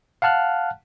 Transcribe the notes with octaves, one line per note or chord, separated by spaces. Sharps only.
F5 F#5 A5 F6 F#6